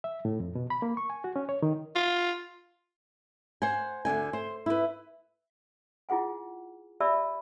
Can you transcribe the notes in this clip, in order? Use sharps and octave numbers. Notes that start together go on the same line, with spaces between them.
E5
A2
F2
B2
B5
A#3
C#6
G#5
F#4
C#4
C#5
D#3
F4
C5 F#5 G#5
D2 G2 D3 G#5
C5
E4 B4
E4 F4 G#4 F#5 G#5
G4 D5 E5 A5 B5 E6